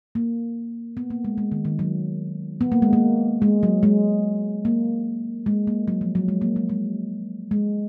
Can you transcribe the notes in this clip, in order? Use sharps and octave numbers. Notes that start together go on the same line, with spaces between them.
A#3
B3
A#3
G#3
G#3
D#3
D#3
F#3
B3
A#3
G#3
A#3
G#3
F#3
G#3
A#3
G#3
A#3
F#3
F3
F#3
G#3
A#3
G#3
G#3
G#3